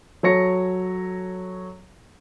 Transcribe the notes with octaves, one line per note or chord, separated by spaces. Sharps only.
F#3 A4 C#5 A#6 C#7